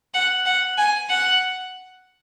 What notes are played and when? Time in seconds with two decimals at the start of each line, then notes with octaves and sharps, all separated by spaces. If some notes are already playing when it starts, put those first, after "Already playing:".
0.14 F#5
0.45 F#5
0.77 G#5
1.10 F#5